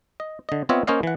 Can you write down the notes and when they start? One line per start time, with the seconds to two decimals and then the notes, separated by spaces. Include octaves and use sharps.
0.20 D#5
0.49 D3 D#5
0.69 B3 C4 F4 C#5 D#5 E5
0.87 A#3 C#4 C5 C#5 D#5 F5
1.03 E3 F#5